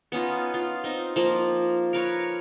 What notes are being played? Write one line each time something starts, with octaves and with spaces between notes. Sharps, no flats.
B3 C#4 D#4 F4
F4
C4 D#4
F3 A#3 F4
A#4 B4 C#5